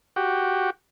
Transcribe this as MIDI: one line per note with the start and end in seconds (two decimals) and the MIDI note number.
0.16 0.70 66
0.16 0.70 67